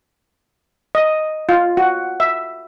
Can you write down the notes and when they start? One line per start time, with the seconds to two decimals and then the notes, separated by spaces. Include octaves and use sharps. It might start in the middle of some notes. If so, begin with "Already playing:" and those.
0.95 D#5
1.49 F4
1.77 F#4
2.20 E5